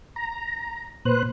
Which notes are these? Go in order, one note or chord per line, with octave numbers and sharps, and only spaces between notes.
A#5
A#2 B4 C5 F#6